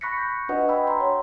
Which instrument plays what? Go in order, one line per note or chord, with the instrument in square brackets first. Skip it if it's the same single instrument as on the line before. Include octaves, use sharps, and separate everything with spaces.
[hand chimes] B5 C#6 F#6 A#6 B6 C#7
G6
D4 F#4 B4 D#5 F#5 G#5
G5 G#5 B5 E6
A#5 C6
C#5